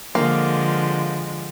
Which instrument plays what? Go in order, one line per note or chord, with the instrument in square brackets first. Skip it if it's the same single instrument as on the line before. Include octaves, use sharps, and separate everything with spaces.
[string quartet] D3 F3 G#3 [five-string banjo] A#3